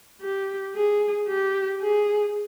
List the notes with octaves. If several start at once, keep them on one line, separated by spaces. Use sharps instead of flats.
G4
G#4
G4
G#4